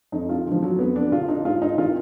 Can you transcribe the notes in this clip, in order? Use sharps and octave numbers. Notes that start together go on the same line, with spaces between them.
F2 D#4
F4
D3
F3
F#3
F2 B3
D4
D3 F4
D#4
G#2 F4
D#4
D#3 F4